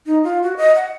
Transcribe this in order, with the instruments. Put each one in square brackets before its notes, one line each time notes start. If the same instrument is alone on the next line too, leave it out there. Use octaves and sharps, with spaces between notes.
[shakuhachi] D#4
F4
F#4
D#5
F#5